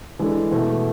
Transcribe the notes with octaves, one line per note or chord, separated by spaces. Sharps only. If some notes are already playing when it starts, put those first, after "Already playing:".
E3 G#3 D4 A4
E2 B2 A3